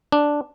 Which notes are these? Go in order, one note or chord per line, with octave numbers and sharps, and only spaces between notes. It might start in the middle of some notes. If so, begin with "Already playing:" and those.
D4